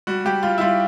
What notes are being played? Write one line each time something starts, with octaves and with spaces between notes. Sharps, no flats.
G3 F#4
G3 G4
G3 F4
E4
G3 F4